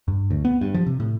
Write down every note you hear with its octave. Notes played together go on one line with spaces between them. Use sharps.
G2
D2
B3
G2
F3
C3
A2